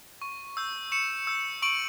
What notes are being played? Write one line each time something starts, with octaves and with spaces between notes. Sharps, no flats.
C#6
E6 G6
C#6 C#7 E7
E6 G6
C#6 D7 F#7